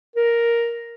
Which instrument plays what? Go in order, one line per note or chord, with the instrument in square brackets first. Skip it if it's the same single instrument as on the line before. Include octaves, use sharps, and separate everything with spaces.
[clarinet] A#4